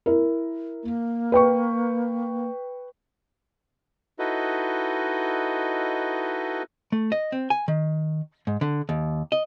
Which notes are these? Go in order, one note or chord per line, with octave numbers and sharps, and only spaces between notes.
E4 A#4
A#3
B4 G5 C#6
D#4 E4 F#4 A4 B4 D#5
A3
D#5
C4
G#5
D#3
G#2
D3
D#2
D#5